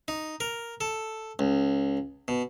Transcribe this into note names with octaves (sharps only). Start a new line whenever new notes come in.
D#4
A#4
A4
C#2
B2